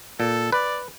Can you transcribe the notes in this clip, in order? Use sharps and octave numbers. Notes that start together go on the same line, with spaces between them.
A#2 A4
B4 D5